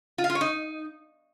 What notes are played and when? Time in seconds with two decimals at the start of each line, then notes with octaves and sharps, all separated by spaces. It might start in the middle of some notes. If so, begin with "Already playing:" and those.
0.18 F4
0.24 F5
0.30 F4
0.35 C#5
0.41 D#4